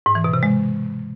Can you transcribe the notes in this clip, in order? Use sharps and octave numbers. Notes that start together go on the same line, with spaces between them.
G#2
E3
B2
C3
G#3